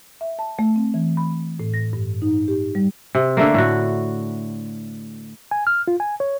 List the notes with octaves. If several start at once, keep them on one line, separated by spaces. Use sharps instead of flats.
E5
A5
A3
C4
E3
B5
A2
A#6
G2
D#4
G4
G3
C3
D3 A3 A#3
A2 F#4
G#5
F6
F4
G#5
C#5